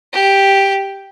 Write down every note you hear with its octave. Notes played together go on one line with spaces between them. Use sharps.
G4